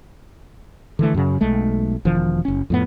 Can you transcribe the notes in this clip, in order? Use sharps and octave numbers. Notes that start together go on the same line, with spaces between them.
D3 E3 A3
F#2 C#3
B1 G#3 A3
E1 D#3 F3
F#1 C#4
F2 A2 B3